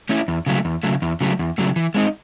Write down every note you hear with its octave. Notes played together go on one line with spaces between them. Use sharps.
A3 C#4 E4
E2
C#3 F#3 A3
E2
C#3 F#3 A3
E2
C#3 F#3 A3
E2
C#3 F#3 A3
E3
G#3 C4 D#4